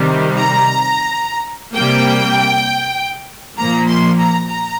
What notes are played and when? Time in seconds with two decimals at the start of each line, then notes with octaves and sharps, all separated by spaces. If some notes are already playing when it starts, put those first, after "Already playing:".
Already playing: C3 D#3 G3
0.37 A#5
1.74 C3 G3 A#3 G5
3.57 A#2 F3 A#3 A#5
3.89 C6
4.19 A#5
4.49 A#5